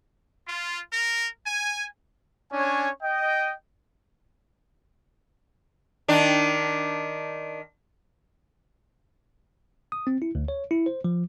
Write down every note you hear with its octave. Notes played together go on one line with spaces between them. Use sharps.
F4
A#4
G#5
C#4 D4 C#5 G#5
D#5 G5
D#3 D4
D#6
C4
E4
D2
C#5
E4
C5
F3